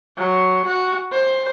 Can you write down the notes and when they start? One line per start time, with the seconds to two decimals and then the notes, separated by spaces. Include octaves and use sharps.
0.17 F#3
0.65 F#4
1.12 C5